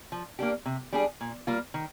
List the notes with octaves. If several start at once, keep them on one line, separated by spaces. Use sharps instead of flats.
F3
A#3 D4 G4
C3
G3 D4 G#4
A#2
G3 A#3 F4
D#3